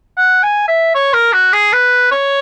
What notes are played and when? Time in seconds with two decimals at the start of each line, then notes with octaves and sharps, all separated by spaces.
0.17 F#5
0.43 G#5
0.68 E5
0.95 C#5
1.13 A#4
1.33 F#4
1.53 G#4
1.73 B4
2.11 C#5